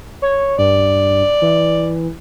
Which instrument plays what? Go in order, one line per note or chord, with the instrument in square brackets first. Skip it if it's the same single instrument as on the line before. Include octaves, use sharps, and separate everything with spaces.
[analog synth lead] C#5
[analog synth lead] G2 [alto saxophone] D5
[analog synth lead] E3